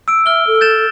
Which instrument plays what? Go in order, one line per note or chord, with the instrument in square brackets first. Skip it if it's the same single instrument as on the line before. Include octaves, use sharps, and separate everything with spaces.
[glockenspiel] E6 D7
[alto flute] E5 [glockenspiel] F6 G7
[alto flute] A4
[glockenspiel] G6 A6 E7